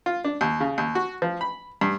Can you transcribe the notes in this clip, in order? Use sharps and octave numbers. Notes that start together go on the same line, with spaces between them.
F4
D4
D#2
C#3
D#2
F#4
F3
B5
G2